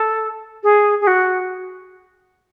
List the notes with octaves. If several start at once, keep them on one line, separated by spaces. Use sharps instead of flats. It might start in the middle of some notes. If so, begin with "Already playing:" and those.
Already playing: A4
G#4
G#4
F#4